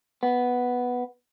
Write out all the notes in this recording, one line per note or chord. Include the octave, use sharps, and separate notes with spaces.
B3